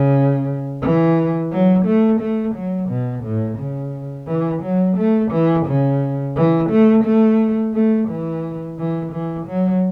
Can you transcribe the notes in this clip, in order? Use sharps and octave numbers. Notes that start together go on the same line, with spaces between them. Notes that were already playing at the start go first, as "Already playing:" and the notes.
Already playing: C#3
E3
F#3
A3
A3
F#3
B2
A2
C#3
E3
F#3
A3
E3
C#3
E3
A3
A3
A3
E3
E3
E3
F#3